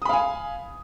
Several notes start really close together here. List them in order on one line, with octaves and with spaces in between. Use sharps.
D#6 B5 F5 G#5